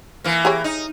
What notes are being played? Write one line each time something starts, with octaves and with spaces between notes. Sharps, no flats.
E3 A#3
G4 G#4 C#5
D#4